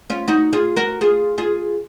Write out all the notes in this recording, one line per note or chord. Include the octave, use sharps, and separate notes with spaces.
C#4 F4
D#4 F#4
F4 G#4
F#4 A#4
F4 G#4
F4 G#4